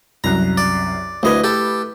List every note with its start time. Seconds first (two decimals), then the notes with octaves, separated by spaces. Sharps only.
0.24 C2 F#2 A#5 F#6
0.57 D5
1.23 D2 A3 E4 B4 D#5 G#5
1.44 G4 A4